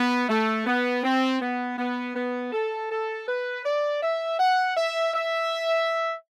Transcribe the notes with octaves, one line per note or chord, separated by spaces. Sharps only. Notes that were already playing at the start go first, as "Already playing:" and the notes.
Already playing: B3
A3
B3
C4
B3
B3
B3
A4
A4
B4
D5
E5
F#5
E5
E5